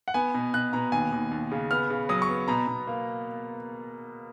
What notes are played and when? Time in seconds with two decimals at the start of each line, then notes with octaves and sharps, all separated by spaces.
0.08 F#5
0.14 B3 G#5
0.34 B2
0.54 B2 F#6
0.73 B2 A#5
0.92 D#2 G#5
1.12 D#2
1.31 D#2
1.52 C#3
1.71 B3 F6
1.90 C#3
2.09 F#3 D#6
2.22 C#6
2.29 B3
2.48 B2 A#5
2.67 B2
2.87 A#3